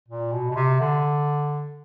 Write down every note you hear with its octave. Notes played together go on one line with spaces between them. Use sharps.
A#2
B2
B2
C3
D3